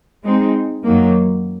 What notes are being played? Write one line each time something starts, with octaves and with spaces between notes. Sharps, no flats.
G#3 C4 D#4
F#2 D#3 F#3 A#3